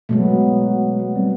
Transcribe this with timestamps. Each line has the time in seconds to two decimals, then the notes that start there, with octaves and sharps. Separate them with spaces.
0.09 B2 F#3 G#3 A3 B3
1.16 G3 C4